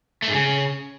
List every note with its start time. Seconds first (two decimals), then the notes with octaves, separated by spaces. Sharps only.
0.22 A3
0.28 G#2
0.34 C#3